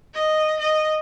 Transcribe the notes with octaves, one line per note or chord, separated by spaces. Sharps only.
D#5
D#5